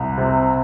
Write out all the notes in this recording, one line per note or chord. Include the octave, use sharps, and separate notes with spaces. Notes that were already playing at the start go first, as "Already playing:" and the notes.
Already playing: C2
C3